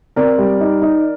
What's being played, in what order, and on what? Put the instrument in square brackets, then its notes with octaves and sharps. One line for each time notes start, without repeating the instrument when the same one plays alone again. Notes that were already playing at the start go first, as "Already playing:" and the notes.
[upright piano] C4 A#4 D5
G3
D#4
D#4